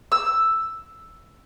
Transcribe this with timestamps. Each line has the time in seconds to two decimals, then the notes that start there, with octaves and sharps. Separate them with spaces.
0.12 E6